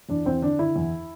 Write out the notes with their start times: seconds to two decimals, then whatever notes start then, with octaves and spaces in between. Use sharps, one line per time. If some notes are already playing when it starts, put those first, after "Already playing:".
0.09 E2 D4
0.25 E2 C4
0.42 D3 D4
0.59 D3 E4
0.76 E2